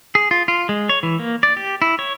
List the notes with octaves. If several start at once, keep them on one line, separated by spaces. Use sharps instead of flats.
G#4
F4
F4
G#3
C#5
E3
A#3
D5
G4
E4
C#5